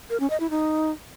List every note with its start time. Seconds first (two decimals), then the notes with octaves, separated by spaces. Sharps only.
0.10 A#4
0.20 C#4
0.30 D#5
0.40 E4
0.50 D#4